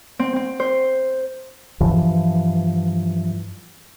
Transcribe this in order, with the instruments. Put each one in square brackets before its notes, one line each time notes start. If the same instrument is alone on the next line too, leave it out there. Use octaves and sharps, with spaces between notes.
[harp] C4
C4
C5
[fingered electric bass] G2 E3 F3